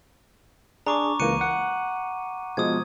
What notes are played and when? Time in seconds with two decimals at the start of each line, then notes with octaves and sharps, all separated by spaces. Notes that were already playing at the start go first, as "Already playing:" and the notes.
0.87 D4 G#4 A#5 C#6 D6
1.20 C#2 E3 A#3 F#6 C#7 D#7
1.41 F#5
2.57 B2 F3 G#3 D#6 G#6